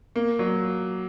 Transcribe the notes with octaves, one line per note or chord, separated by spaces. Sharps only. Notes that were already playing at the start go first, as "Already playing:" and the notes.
A#3
F#3